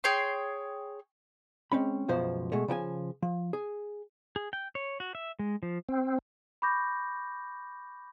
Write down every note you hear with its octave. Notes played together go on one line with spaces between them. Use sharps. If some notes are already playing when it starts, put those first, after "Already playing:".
G#4 C#5 G5 C6
G#3 C4 C#4 B5
C#2 F#2 B2 F3 C5
B2 G#3 A3
C#3 F3 G5 G#5
F3
G#4
G#4
G5
C#5
F#4
E5
G#3
F3
C4
B5 C#6 D6 G6 A#6